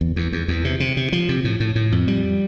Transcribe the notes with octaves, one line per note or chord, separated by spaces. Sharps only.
E2
E2
E2
E2
C3
C3
C3
F3
C3
A2
A2
A2
F2
G3